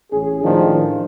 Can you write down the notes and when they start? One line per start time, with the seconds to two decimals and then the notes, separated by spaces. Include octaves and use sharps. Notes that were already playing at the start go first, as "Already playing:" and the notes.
0.12 A1 C#4 G#4
0.43 A2 D#3 F3 G#3 D4